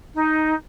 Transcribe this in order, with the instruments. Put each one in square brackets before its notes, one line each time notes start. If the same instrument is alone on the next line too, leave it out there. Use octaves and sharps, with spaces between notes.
[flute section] D#4